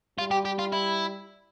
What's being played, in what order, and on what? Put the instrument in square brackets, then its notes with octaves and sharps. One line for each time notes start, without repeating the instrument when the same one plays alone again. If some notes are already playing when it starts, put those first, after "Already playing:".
[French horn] G3 [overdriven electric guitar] F4
[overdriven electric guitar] G4
G4
F4
E4